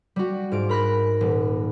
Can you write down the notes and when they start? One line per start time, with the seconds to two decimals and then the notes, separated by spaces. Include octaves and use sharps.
0.16 G3 F#4
0.52 G#2 F4 D7
0.69 A#4 B5 F#6 A#6
1.21 D#1